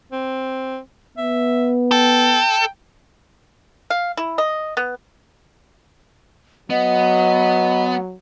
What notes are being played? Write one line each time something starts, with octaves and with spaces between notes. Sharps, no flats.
C4
B3 E5
A4 G5
F5
E4
D#5
B3
F#3 B3 D#5 F#5